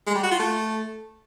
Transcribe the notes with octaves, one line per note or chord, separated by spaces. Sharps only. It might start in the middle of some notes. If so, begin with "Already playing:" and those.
G#3
G3
F#4
F4
A3